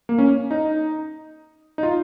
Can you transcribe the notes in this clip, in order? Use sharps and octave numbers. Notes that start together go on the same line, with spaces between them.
A#3
C#4
D#4
D#4
F4